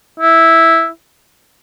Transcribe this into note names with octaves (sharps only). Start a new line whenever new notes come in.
E4